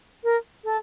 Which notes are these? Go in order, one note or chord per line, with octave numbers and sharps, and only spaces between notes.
A#4
A4